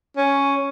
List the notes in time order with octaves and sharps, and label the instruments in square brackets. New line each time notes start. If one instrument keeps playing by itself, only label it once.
[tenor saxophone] C#4